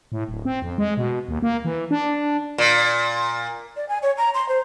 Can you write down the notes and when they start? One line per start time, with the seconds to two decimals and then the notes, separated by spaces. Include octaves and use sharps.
0.12 A2
0.29 D1
0.45 C4
0.62 F2
0.78 G#3
0.97 B2
1.28 D#2
1.42 A#3
1.65 E3
1.91 D4
2.58 A#2
3.76 D5
3.89 G#5
4.03 C#5
4.17 A#5
4.34 C6
4.49 C5